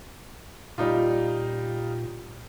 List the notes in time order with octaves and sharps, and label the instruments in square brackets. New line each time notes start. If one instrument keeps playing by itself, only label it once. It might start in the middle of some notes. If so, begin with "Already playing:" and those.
[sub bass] A#2 [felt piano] G3 D#4 F4